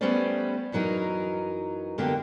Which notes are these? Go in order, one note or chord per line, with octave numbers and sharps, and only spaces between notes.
G3 A3 B3 C#4 C5 D5
F#2 E3 F#3 D#4 A#4
F#2 D3 A#3 B3 G4